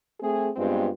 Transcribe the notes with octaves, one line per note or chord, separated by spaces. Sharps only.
A3 C4 G#4
G2 G#3 B3 C4 F4